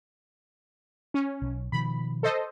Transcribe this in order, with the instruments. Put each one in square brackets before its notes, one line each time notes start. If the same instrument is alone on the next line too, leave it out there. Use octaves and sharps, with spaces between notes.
[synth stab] C#4
[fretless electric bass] B1
[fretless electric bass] B2 D#3 F3 [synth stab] B5
[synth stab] A4 C5 D#5